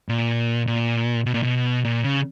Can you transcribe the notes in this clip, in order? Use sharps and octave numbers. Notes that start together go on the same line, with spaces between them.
A#2
A#2
B2
A#2
B2
A#2
C#3